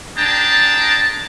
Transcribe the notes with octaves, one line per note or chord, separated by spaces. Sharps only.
D4 G#4 G5 A5 A#5